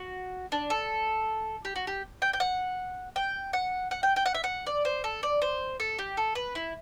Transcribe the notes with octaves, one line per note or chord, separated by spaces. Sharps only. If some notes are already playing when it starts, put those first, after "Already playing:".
Already playing: F#4
D4
A4
G4
F#4
G4
G5
G5
F#5
G5
F#5
F#5
G5
G5
F#5
E5
F#5
D5
C5
A4
D5
C5
A4
G4
A4
B4
E4